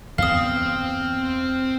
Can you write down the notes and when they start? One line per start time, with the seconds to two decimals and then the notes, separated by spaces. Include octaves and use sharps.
0.18 E2 G2 B3 C4 F5 D#6 F6